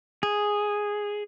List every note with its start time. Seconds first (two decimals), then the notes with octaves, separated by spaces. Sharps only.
0.23 G#4